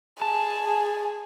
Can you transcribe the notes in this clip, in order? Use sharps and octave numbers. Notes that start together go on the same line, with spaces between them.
G#4 A5